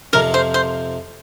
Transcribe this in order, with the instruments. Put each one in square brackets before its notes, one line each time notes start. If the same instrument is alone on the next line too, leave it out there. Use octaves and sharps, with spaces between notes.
[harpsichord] F2 C3 F3 [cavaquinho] A#4
[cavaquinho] C5
C5